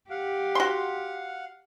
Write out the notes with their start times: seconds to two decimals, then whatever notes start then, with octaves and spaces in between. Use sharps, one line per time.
0.10 G4 F5 F#5
0.55 F#4 C6